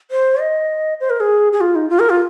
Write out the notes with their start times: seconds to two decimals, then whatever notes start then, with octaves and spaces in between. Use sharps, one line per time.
0.11 C5
0.40 D#5
1.00 C5
1.10 A#4
1.20 G#4
1.53 G#4
1.61 F4
1.75 D#4
1.90 F4
2.00 A#4
2.10 F4